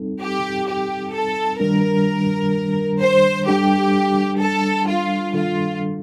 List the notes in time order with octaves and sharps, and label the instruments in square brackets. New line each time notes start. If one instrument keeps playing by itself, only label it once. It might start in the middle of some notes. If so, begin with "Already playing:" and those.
Already playing: [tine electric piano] G3 C4 D#4 A4
[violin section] G4
G4
A4
[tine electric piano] D#3 G3 D4 [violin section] A#4
[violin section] C5
[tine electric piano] G3 D4 A4 [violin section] G4
[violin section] A4
F4
[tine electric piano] D#3 G3 D4 A4 [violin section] F4